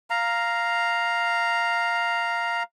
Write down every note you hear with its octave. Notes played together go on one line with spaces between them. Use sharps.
F5 A#5